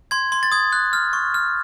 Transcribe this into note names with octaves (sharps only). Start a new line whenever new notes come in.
C6 G#6
C6
A6
D#6 G#6
F#6
F6
C#6
F6